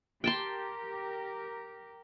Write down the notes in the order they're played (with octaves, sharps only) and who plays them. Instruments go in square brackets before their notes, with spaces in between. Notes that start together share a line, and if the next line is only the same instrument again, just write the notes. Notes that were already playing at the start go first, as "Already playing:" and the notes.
[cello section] G4 A#4 [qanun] G5 A5 C6